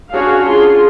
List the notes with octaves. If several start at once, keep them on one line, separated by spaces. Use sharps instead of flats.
C#4 D4 F#4 G#4 C#5 F5
D4 F4 G#4 C6